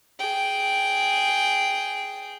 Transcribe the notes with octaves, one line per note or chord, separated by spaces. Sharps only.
G#4 G5